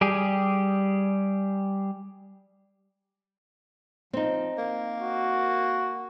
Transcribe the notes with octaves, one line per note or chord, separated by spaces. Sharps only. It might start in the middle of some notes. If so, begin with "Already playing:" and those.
G3 G4 G#4
F3 C4 D#4
A#3
F#4